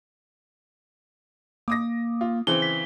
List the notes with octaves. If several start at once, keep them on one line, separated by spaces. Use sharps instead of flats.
A#3 D6 D#6 A#6
F4
C#3 E3 C4 G7
B6